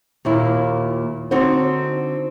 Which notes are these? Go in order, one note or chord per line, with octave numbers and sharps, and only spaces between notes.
D#2 A#2 E4
D3 C4 D#4 F#4 C5